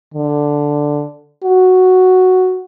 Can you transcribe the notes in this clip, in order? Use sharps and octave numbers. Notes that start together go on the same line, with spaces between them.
D3
F#4